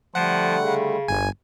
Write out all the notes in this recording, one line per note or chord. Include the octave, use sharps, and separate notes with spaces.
D3 F3 G3 A3 F#5
C#3
G1 G#5